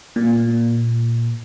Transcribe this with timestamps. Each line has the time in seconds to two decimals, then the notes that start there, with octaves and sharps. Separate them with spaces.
0.16 A#2